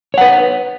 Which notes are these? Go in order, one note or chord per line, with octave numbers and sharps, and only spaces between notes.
B4 C#5 F#5